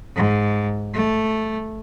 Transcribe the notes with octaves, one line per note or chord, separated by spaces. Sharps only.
G#2
A3